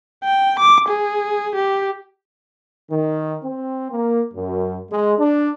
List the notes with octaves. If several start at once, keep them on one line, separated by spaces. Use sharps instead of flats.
G5
D6
G#4
G4
D#3
C4
A#3
F#2
G#3
D4